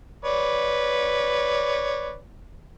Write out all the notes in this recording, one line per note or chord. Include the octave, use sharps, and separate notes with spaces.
B4 C#5 D5